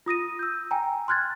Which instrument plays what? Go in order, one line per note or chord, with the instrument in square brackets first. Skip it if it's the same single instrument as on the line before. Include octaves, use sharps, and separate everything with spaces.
[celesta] F4 D#6 A#6 D#7
E6 G6
G5 G#5 A#5
C6 F6 F#6 G#6 A6